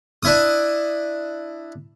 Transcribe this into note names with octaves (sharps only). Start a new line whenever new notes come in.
D4 E4 D#6